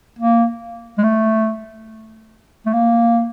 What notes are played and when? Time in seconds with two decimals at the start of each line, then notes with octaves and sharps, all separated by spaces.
0.18 A#3
0.98 G#3
1.03 A3
2.66 A3
2.73 A#3